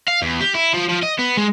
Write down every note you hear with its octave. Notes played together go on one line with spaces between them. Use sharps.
F5
E2
G4
E4
F3
F3
D#5
B3
G#3